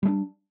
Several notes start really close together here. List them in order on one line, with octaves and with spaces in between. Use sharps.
G3 A3 D4